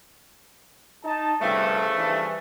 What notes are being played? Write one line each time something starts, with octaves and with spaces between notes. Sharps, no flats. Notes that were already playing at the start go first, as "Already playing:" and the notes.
D#4 A5
G1 C2 G2 C#3 F3 A3
G2 E3